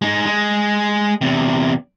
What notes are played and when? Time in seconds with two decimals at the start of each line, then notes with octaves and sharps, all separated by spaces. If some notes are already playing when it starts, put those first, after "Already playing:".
0.02 G#3 D#4
0.26 G#3
1.21 E2 C3